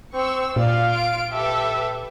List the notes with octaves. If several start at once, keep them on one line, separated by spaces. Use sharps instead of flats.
C4 C#6 E6
A#2 F4 D5 F5
D7
G4 A4 B4 E5